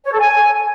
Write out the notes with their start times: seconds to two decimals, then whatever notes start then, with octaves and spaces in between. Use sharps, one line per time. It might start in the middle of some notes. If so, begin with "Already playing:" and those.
0.04 C#5
0.11 A4
0.19 G#5